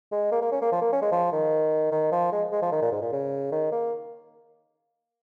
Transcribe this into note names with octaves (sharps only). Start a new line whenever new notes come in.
G#3
A#3
A#3
C#4
A#3
F3
A#3
C#4
G#3
F3
D#3
D#3
F3
G#3
G#3
F3
D#3
A#2
G#2
A#2
C#3
D#3
A#3